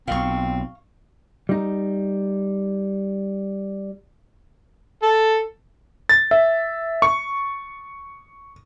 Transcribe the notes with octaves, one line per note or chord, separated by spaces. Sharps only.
B1 A#2 C4 F5 C#6
G3 D#4
A4
A6
E5
C#6